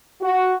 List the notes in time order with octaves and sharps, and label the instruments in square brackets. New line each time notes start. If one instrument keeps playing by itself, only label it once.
[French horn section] F#4